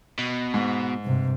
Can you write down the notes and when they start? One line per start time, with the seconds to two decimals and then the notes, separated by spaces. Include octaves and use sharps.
0.19 B2
0.54 G#2
1.03 G2 C3